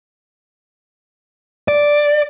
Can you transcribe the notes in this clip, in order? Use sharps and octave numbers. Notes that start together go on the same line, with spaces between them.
D5